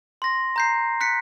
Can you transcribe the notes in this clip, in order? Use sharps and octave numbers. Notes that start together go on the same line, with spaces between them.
C6 A#6
A#5 G6 C7
F#6 B6 C#7